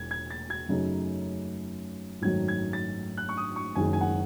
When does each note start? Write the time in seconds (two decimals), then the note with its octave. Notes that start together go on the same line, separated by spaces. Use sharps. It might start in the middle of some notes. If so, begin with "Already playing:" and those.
Already playing: E1 G#6
0.11 G#6
0.31 A6
0.50 G#6
0.69 F#2 C#3 F#3 A3 D#4
2.22 G#1 F#2 D#3 F#3 A3 G#6
2.48 G#6
2.73 A6
3.17 F#6
3.29 C#6
3.37 D#6
3.56 C#6
3.75 F#1 F#2 D#3 G#3 G#5
3.93 G#5
4.01 F#5